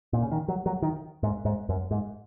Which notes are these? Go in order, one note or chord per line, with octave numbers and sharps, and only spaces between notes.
A#2
C#3
D#3
F#3
F#3
D#3
G#2
G#2
F#2
G#2